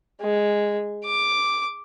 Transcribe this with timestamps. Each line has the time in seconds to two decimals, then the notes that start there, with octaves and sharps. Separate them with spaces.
0.21 G#3
1.05 D6